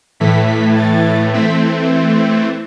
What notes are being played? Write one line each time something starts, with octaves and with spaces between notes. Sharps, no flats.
A2 E3 A3 B6
B6
A6
E3 A3 C4 B6